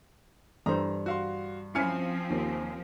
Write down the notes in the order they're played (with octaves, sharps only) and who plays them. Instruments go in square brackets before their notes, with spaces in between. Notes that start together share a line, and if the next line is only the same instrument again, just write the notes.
[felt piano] G2 [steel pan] E3 A4 C5 [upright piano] A#5
[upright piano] F#4 F5 C6
[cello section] F3 C4 [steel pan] C#4 E4 [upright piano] G#5 F6 C#7
[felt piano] D#2